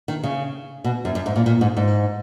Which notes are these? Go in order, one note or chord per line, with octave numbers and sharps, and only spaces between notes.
D#3
C#3
B2
F#2
F#2
G#2
A#2
A#2
G#2
G#2